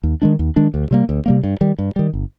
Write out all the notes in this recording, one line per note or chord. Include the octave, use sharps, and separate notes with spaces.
D#2
D#3 G#3 D4
D#2
D#3 G#3 D4
D2
C3 G3 A#3
D2
C3 G3 A#3
G2
D#3 G3
G2
D#3 G3
G1